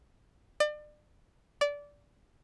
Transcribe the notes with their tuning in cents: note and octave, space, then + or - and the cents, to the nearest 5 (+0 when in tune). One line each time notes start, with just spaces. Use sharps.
D5 +35
D5 -20